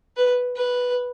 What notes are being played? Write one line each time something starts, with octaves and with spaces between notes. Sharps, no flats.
B4
B4